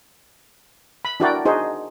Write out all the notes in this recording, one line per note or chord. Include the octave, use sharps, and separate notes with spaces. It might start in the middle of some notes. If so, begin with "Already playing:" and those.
B5
D4 E4 F#4 A#4 D5 G5
D4 D#4 F#4 G#4 C5